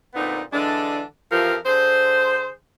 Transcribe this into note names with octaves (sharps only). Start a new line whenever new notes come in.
A#2 D3 B3 C4 D#4
D3 E3 G#3 D4
F2 E3 F3 G4 A#4
D3 G#4 C5